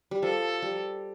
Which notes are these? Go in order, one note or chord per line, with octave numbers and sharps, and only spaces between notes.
G3
F3 A4
G3